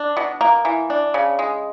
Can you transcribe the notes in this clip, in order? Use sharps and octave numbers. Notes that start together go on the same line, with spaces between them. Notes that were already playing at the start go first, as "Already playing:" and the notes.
Already playing: D4
B2
A#3
E3
D4
C#3
G#3